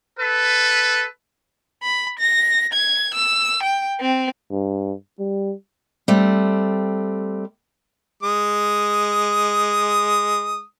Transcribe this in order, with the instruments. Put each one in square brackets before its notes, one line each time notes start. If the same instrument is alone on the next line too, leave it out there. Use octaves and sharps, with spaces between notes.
[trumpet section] A4 B4
[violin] B5
A#6
G#6
E6
G5
C4
[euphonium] G2
G3
[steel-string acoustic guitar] G3 A3 C4
[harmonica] G#3 D#6